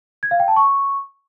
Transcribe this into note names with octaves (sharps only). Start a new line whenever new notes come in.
G#6
F5
G5
A5
C#6